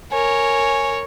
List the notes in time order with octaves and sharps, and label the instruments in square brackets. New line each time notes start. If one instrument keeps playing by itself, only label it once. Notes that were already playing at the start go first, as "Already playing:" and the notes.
[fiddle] A#4 C#5 [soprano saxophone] G#5